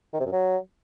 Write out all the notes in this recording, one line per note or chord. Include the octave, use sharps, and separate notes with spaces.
D#3
C3
F#2
F#3